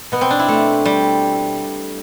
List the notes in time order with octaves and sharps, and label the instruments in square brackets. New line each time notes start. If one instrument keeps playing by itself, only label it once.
[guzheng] B2 B3
C4
D4
E4
A3
G3